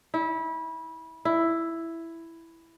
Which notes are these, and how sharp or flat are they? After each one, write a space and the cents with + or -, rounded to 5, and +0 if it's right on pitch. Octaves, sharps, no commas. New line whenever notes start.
E4 -25
E4 +5